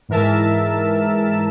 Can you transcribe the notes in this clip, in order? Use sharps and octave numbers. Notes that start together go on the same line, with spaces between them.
G#2 E3 A#4 E5 A5 E7